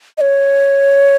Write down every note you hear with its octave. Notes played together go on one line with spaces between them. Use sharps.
D#5
C#5